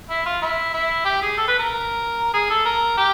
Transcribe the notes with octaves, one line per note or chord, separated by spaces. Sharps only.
E4
F4
E4
E4
G4
G#4
A4
B4
A#4
G#4
A4
A#4
G4